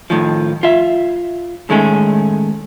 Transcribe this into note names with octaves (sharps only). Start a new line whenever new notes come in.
A2 D#3 F3
F4 E5
A2 D#3 G#3 A3 C#4